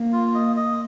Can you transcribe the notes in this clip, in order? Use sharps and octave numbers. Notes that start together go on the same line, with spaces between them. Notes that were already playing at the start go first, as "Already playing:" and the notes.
Already playing: A#3
F4
D#5
D#5